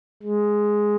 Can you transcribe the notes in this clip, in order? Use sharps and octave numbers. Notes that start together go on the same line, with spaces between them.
G#3